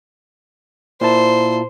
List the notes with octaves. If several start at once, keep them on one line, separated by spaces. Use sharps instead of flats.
A#2 E4 C5 A5